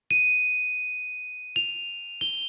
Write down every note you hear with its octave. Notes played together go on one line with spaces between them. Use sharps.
D#7
F7
G7